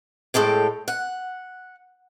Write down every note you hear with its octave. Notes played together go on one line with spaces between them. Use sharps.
A2 G#3 A4 G5
F#5